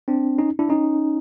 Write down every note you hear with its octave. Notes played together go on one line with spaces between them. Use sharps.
C4 D4
C#4 D#4
D4 E4
C#4 D#4